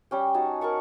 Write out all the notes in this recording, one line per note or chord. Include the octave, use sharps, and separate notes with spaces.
G3 C#4 G5
D#4 F#4 G#5 A5
A#4 F#5 A5 C#6